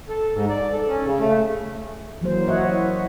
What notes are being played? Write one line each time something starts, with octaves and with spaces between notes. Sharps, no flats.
A4
G#2
D5
A4
C#4
C#3
A3
E3 F#3 A#3 C5
E4 F#4 C#5 D#5 E5 F#5